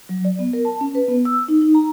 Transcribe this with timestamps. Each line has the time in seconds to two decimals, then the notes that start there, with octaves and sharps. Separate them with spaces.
0.09 F#3
0.25 D5
0.39 B3
0.53 A#4
0.65 A5
0.81 C#4
0.95 B4
1.08 B3
1.25 E6
1.48 D#4
1.62 D#4
1.75 A#5